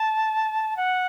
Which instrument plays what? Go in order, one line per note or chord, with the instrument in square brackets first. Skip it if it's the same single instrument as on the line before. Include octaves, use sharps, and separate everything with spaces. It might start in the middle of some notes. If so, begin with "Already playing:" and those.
Already playing: [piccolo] A5
F#5